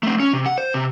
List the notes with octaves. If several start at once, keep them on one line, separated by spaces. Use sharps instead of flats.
A3 C4
C#4
C3
F#5
C5
C3